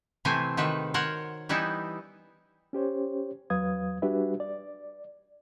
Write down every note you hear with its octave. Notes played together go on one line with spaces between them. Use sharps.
C3 E3 A3 C4 G#5
C3 D#3 F#4 B4
A#4 C5 C#5 F#5
E3 G3 B3 D#4 E4
C#4 G4 C5 C#5
E2 F#3 B4 F5 D#6 G#6
G3 D4 F#4 G4 B4 E5
D5